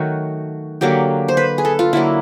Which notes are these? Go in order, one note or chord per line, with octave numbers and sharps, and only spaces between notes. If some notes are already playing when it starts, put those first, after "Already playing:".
Already playing: D#3 F#3 A3 F#4
D3 F#3 A#3 G4
C5
B4
G#4
A4
F4
D3 F#3 A#3 E4